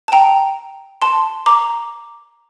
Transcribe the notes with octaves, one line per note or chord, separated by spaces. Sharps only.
A5
G5 A#5
A5 C6
A#5 D6